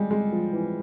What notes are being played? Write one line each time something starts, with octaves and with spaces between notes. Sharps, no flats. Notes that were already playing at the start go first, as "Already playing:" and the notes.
Already playing: G3 G#3
G#3
F3
E3